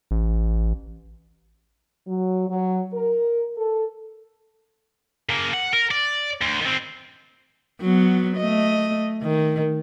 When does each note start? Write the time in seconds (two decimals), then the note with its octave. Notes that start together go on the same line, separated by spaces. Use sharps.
0.11 A1
2.07 F#3
2.49 F#3
2.93 A#4
3.57 A4
5.29 C#3 A#3
5.53 F#5
5.73 A#4
5.91 D5
6.41 D2
6.61 D#3 C4
7.81 F#3 B3
8.37 A3 D#5
9.23 D#3